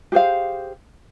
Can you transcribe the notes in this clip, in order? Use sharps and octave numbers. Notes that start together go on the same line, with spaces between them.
G4 G#4 C5 F5